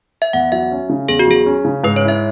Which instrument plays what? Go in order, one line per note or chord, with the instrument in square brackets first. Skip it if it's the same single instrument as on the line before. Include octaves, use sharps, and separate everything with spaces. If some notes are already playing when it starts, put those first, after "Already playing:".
[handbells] E5
[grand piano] E2 [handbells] F#5
[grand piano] F#3 [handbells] E5
[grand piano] C#4
C#3
[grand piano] E2 [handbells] G#4
[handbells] F#4
[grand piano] F#3 [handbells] G#4
[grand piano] C#4
C#3
[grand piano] G#2 [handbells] B4
[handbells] C#5
[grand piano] E4
[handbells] E5